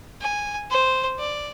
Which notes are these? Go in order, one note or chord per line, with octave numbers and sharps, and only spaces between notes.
G#5
C5
D5